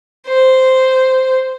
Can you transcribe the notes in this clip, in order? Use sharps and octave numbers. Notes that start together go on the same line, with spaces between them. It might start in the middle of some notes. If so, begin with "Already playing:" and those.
C5